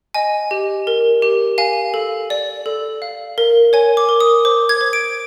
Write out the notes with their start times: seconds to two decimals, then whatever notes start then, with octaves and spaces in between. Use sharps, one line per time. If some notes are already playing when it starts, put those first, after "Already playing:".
0.14 D#5 G#5
0.51 G4
0.87 A#4
1.22 G4
1.58 F5 G#5
1.94 A4
2.30 D5
2.66 A4
3.02 F5
3.38 A#4
3.73 C#5 G#5
3.97 D6
4.09 A#4
4.20 D#6
4.45 C5 D6
4.69 G#6
4.81 C5
4.93 D7